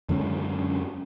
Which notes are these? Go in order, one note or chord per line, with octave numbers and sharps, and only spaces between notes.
F#2 D3 G#3 C#4